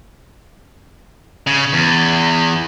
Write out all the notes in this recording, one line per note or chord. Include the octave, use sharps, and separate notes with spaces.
C#3
E2